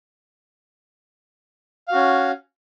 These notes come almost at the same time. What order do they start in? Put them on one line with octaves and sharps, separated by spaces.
F5 F#4 C#4